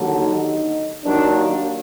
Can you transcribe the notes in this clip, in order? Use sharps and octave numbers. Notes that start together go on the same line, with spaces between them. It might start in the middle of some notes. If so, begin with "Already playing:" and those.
Already playing: D#2 D3 F#3
D#4
D#2 D#3 F#3 D4
A#3